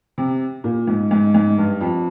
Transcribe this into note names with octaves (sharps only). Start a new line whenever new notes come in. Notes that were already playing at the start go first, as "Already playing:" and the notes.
C3
A#2
G#2
G#2
G#2
G2
F2